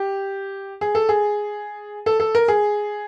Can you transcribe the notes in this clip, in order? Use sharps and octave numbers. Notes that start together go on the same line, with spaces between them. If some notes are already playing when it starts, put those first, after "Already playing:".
Already playing: G4
G#4
A4
G#4
A4
A4
A#4
G#4